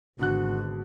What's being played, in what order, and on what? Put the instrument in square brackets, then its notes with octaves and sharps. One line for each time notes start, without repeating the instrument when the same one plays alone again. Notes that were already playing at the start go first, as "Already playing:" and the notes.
[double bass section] G#1 [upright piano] B2 D3 F#6 [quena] F#4